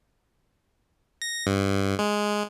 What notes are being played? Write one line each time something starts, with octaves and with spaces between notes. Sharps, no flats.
A#6
G2
G#3